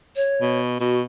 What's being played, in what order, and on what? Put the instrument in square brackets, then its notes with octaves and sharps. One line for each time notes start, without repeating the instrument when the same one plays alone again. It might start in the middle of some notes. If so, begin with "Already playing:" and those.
[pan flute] C#5
[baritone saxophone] B2
[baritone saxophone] B2 [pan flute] F#4